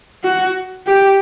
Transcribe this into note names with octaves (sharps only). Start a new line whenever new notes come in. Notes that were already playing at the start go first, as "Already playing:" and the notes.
F#4
G4